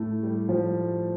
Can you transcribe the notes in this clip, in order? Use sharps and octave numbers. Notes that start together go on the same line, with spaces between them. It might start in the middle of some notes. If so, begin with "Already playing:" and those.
Already playing: A2 A3
G3
F3